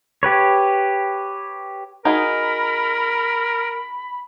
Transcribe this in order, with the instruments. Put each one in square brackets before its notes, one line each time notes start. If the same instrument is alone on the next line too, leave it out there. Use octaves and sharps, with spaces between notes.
[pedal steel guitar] G4 B4 C#5
[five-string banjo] D#4 F#4 G#4 [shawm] A#4 [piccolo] B5